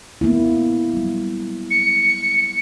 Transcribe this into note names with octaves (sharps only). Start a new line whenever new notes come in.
A#3 B3 E4
F#3 G3
C#7